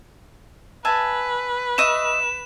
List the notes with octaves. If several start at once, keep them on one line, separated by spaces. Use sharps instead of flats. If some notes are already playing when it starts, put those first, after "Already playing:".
B4 E5 G#5 A5
D#5 E5 C#6 E7